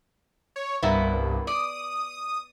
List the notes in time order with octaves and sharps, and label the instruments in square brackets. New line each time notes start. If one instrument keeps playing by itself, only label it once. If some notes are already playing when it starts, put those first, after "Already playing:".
[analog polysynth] C#5
[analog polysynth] C2 G2 [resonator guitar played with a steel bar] A#3 B3 E4
[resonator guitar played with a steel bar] D5 [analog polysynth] D#6